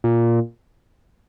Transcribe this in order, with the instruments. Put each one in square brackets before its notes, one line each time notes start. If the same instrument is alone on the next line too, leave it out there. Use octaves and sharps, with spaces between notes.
[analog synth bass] A#2